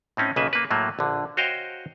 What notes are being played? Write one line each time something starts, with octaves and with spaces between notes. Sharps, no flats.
A2 C4 C#4 D#4
B1 C#3 A#3 B4 E5
A#3 B4
A2 F#3 A3 A#3
A#1 D3
F#4 C5 C#5 D#5 F5 G5